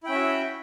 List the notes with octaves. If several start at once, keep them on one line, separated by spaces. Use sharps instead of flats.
C#4 E4 F#4 E5 G5